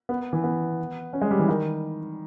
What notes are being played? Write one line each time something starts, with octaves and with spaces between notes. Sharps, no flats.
B3
E3
B3
C#4
G#3
G3
E3
D#3